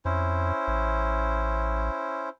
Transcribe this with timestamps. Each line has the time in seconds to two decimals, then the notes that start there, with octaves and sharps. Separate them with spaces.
0.05 F2 C#4 E4 C5
0.68 A1